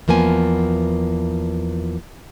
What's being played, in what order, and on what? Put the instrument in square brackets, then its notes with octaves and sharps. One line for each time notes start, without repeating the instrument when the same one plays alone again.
[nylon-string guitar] E2 F3 A#3 B3 G#5